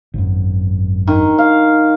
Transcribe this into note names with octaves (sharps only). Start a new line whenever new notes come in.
G#1 F#2
D#3
F5